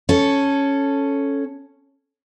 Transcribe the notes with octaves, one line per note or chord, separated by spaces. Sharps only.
C#4 A4